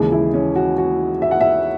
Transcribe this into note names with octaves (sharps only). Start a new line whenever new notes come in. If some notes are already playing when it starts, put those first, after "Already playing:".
Already playing: D#2 C#3 E3 G#3 G#4
E4
C#4
F#4
F#4
E5
F#5
E5